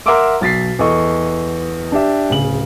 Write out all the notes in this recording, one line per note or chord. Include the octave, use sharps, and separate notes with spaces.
A#4 E5 F#5 C6 D6 E6
B1 A6 B6 C7
E2 A4 D#5 C#6
D4 G4 E5
D1 C#3 F#7